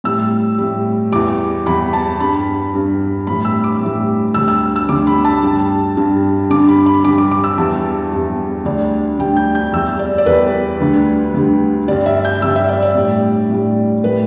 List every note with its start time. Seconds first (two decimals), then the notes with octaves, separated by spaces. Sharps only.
0.04 A2 G3 E6
0.58 A2 G3
1.12 E2 E3 G3 D6
1.66 E2 E3 G3 B5
1.93 A5
2.20 G2 G3 B5
2.74 G2 G3
3.27 A2 E3 G3 B5
3.45 E6
3.64 D6
3.81 A2 E3 G3
4.34 D2 D3 G3 E6
4.48 E6
4.76 E6
4.89 D2 D3 G3 D6
5.07 B5
5.25 A5
5.43 G2 G3
5.97 G2 G3
6.50 G2 D3 G3 D6
6.69 B5
6.86 B5
7.03 G2 D3 G3 D6
7.18 D6
7.32 D6
7.44 E6
7.57 E2 E3 G3 A5
8.12 E2 E3 G3
8.65 D2 D3 G3 D5
9.19 D2 D3 G3 G5
9.37 G6
9.55 G6
9.72 E2 E3 G3 E6
9.99 D5
10.18 D5
10.26 E2 E3 G3 B4
10.80 D2 D3 G3
11.34 D2 D3 G3
11.88 G2 D3 G3 D5
12.06 E5
12.25 G6
12.42 G2 D3 G3 E6
12.56 E5
12.69 D5
12.82 D5
12.95 A2 G3
13.50 A2 G3
14.03 A2 G3 B4